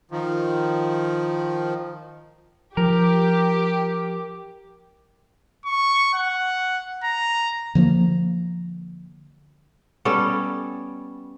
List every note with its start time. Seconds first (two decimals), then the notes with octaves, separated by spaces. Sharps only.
0.11 D#3 F3
2.77 F3 G4 A#4
5.66 C#6
6.14 F#5
7.04 A#5
7.75 D3 F3 G3 A#3
10.05 G3 B3 C#4 A4